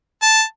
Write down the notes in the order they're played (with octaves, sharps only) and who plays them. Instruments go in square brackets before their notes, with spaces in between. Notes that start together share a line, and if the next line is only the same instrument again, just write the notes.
[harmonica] A5